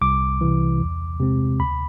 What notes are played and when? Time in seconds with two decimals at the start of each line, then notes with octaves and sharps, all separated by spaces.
0.01 C2 D6
0.41 C3 E3
0.81 E2
1.20 C3 G#3 C4
1.59 D2 B5